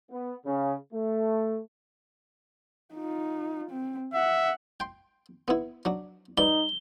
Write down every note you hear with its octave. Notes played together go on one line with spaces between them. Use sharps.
B3
C#3
A3
D#4 F4
C4
E5 F#5
G5 C6
B3 E4
F#3 D4
G2 D#4 D5 B5 G7